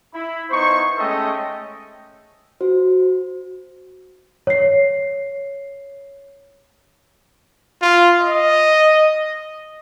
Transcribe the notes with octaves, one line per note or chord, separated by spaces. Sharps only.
E4 B5
B3 D#4 E4 C5 C#6
G#3 A3 C#4 A4 D#5 G5
F#4 C5
C#5 C7
F4
D#5